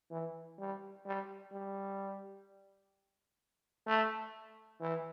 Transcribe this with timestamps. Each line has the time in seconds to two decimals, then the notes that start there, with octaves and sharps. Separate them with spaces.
0.11 E3
0.59 G3
1.06 G3
1.52 G3
3.87 A3
4.80 E3